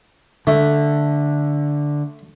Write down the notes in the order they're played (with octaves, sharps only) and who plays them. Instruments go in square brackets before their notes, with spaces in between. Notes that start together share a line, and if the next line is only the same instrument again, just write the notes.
[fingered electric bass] D3 [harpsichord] A3